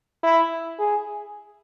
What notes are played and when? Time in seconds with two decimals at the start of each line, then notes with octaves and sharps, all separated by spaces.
0.23 E4
0.79 G#4